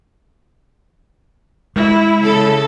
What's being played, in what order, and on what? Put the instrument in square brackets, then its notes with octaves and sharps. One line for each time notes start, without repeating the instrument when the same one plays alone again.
[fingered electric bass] G#3 [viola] E4
[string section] C#3 A4